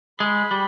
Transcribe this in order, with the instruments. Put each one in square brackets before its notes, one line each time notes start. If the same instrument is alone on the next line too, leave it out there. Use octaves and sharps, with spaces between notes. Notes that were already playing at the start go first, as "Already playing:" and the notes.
[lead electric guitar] G#3 [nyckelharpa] B5
[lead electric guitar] G3